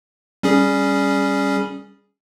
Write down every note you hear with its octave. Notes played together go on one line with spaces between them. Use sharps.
G3 C#4 G#4